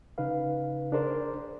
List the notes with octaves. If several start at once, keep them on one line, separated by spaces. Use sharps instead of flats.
C#3 D#4 B4 F5
D4 G#4 A#4 C5 D5